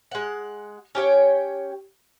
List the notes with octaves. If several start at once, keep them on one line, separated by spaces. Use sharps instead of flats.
G#3 F#5
C#4 G4 C#5 G5